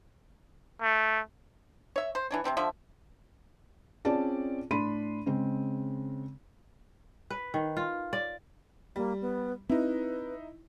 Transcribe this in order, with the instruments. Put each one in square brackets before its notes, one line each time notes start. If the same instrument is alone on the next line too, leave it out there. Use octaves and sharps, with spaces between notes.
[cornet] A3
[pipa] C#5 E5
C5
E3 D4 C#5
C3 F#3 C4 D4
D3 F3 E5
[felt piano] C4 C#4 F4 G#4 D5 A5
A2 D4 B5 C6 D#7
C#3 G#3 C4
[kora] B4
D#3
F4
D5
[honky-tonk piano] G3 [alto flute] A#3
[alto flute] B3
[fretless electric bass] C4 [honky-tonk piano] D#4 E4 [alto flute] B4